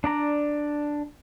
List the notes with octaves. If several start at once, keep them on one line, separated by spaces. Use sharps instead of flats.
D4 D5 A#5